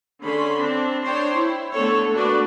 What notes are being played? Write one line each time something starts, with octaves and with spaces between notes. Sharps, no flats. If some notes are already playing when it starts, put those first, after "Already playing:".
D3 C#4 B5 C6
C4 D4
D4 C5 C#5 G5 C6
E4
D3 A3 B3 A4 C#5
A3 A#3 D4 F#4 B4 D5